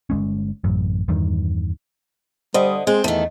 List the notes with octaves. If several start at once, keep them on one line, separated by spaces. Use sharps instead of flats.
G1 G2 G#3 C#4
A1 F#2
E2 G2 D#3
D3 G3 C5 D#5 D#6
G#3 C4 D#5
E2 D#3 A3